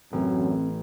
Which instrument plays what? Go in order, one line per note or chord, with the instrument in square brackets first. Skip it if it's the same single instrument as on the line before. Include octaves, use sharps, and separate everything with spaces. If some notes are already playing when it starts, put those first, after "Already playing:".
[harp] A1 [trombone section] F#2 [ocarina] C4